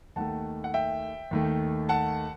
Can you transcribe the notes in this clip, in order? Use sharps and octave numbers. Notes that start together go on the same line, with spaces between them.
D#2 D#3 A3 F#5 A5
F#5
E5 G5
D#2 D#3 A3
F#5 A5